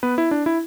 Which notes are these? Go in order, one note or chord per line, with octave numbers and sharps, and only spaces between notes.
B3 B4
E4
D4
E4